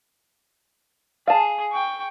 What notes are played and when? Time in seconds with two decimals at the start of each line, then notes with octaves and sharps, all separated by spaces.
1.28 G#4 F5 A5
1.72 G5 C#6